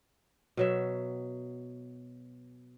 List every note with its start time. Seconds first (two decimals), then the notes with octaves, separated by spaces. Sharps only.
0.57 B2 F#3 E5